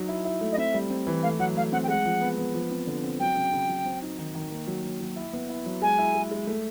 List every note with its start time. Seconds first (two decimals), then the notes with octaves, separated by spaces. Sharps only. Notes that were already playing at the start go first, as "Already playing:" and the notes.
Already playing: F#3 D#4
0.08 E4
0.25 E4
0.41 A3
0.52 D#5
0.58 C4 E5
0.74 G3
0.90 C4
1.07 E3
1.23 A3 F5
1.39 F#3 F#5
1.56 A3 F5
1.72 C4 F#5
1.83 G5
1.88 G#3 F#5
2.05 F3
2.22 B3
2.38 B3
2.54 F3
2.71 C4
2.87 D3
3.03 C4
3.19 F#3 G5
3.36 C#3
3.53 C#3
3.69 F#3
3.86 C4
4.02 D#4
4.18 D#3
4.35 D#3
4.51 A#3
4.67 F#3
4.84 F#3
5.00 F#3
5.16 E4
5.33 B3
5.49 E4
5.66 F#3
5.82 G#3 G#5
5.98 E4
6.15 G#3
6.31 G#3
6.47 A3